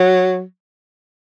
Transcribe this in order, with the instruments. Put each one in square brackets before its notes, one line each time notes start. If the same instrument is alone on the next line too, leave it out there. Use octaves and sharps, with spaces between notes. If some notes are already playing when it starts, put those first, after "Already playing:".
Already playing: [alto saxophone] F#3